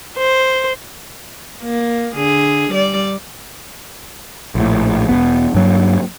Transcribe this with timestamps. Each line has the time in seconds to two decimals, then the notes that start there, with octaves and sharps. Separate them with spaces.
0.17 C5
1.62 A#3
2.15 D3 G#4
2.70 G3 D5
4.55 A#1 A2
5.09 E1 F2 B3
5.55 G2 F#3 A#3